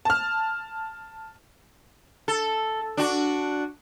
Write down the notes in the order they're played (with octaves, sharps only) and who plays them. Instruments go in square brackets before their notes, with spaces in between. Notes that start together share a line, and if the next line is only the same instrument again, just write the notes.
[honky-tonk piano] A5 F6
[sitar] A4
D4 F#4